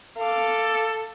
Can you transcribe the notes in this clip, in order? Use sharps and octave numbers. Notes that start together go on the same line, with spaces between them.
A4 F5 D6